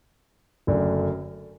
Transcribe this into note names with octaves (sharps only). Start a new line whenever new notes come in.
F#1 F#2 D3 A3 D4